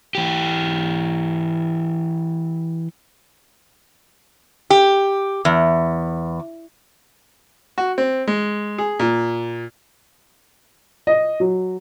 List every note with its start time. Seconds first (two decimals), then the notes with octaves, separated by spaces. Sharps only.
0.15 E3 G4
4.70 G4
5.45 E2
7.78 F#4
7.98 C4
8.28 G#3
8.78 G#4
9.00 A#2
11.07 D#5
11.40 F#3